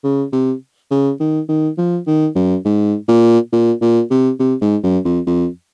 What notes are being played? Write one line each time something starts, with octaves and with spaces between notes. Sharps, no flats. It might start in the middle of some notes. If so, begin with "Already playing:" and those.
C#3
C3
C#3
D#3
D#3
F3
D#3
F#2
G#2
A#2
A#2
A#2
C3
C3
G#2
F#2
F2
F2